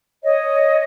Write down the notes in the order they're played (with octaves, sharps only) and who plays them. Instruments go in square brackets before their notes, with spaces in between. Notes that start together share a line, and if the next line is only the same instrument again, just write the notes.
[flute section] C#5 D#5